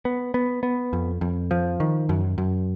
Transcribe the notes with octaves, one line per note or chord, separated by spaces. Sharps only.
B3
B3
B3
F2
F2
F3
D#3
F#2
F#2